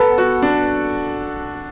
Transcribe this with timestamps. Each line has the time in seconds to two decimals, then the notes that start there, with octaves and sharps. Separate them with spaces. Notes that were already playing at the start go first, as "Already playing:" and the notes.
Already playing: B3 A4
0.18 F#4
0.42 D4